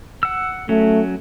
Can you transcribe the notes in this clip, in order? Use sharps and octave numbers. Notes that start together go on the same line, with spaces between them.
F#5 E6
F#3 A3 C#4